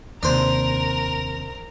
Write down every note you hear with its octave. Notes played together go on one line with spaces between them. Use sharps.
D#2 C3 D4 A#4 C5